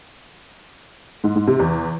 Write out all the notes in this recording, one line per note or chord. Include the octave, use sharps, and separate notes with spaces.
G#2
G#2
C3
E2